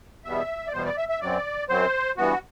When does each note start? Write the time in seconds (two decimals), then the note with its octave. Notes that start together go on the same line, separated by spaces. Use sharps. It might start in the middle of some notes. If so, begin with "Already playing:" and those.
0.25 E2 B2 G3 B3 E5
0.67 D5
0.73 E2 B2 G3 B3 C5
0.85 D5
0.97 E5
1.09 E5
1.21 F#2 F#3 C4 D5
1.69 F#2 F#3 C4 C5
2.17 G2 E3 B3 F#4